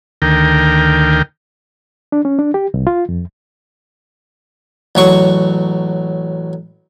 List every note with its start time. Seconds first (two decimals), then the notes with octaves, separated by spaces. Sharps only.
0.22 D2 D#3 A#4 G5
2.12 D4
2.25 C#4
2.39 D4
2.54 G4
2.74 C2
2.87 F4
3.09 F2
4.95 A1 F#3 C#6